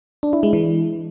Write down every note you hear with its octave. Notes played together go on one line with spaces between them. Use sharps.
D4
E4
G#3
E3